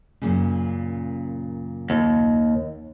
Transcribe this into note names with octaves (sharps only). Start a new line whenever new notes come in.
F#2 A#2 C#3
D#2